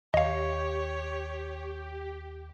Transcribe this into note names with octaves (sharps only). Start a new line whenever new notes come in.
D#2 G4 C#5 D#5 F5